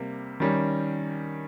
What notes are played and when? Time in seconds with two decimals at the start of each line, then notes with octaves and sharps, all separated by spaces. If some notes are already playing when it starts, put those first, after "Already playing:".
Already playing: C3 G3 A#3
0.40 D#3 G3 C#4